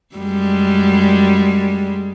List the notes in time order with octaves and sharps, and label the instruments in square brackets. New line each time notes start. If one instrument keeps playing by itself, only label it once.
[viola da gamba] F#2 G3 G#3